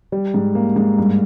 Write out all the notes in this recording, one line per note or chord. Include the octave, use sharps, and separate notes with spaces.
G3
G#2
A#3
G#2
G2